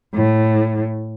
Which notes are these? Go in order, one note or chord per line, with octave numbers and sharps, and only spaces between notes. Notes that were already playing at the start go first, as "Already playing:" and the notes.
A2